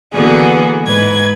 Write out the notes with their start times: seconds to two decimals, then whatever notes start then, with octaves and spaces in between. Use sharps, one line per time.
0.14 D3 E3 A#3 B3 F#4 G#4
0.84 G#2 B4 G#6